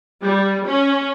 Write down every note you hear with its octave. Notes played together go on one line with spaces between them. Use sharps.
G3
C#4